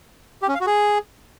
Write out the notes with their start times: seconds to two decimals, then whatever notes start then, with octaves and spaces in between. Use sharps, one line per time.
0.42 G4
0.48 C#4
0.54 F5
0.61 F#4
0.67 G#4